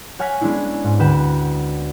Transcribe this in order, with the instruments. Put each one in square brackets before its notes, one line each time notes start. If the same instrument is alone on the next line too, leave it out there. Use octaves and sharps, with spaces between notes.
[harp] C#5 F#5 G#5 F6 A#6 B6
G#3 B3 C#4 D4 E4
G#2
D2 B4 F#5 G5 E7